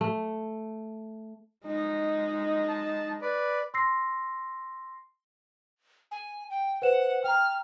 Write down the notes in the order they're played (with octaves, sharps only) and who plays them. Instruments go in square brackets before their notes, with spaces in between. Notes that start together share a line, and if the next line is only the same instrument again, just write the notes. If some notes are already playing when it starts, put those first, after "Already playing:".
[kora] A3
[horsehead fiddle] G#3 D#4
[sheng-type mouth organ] A5
B4 D5
[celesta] C6 E6 A#6 C7
[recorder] G#5
G5
[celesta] B4 C5 E7 [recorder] F#5
[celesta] G5 A#5 [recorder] F6